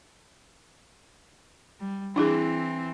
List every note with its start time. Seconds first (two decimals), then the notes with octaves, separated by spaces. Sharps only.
1.80 G3
2.16 E3 C4 D4 E4 G#4